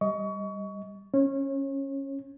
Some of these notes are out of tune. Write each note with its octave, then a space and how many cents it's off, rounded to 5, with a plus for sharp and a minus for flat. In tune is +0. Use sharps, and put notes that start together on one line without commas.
G3 +0 D#5 +15 C#6 +25
C#4 -10 C#5 -30